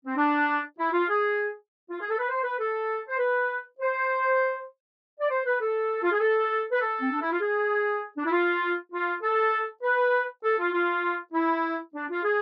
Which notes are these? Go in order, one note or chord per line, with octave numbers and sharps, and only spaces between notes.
C4
D4
E4
F4
G#4
F4
G#4
A4
B4
C5
B4
A4
C5
B4
C5
D5
C5
B4
A4
F4
G#4
A4
B4
A4
C4
D4
E4
F4
G#4
D4
E4
F4
F4
A4
B4
A4
F4
F4
E4
D4
F4
G#4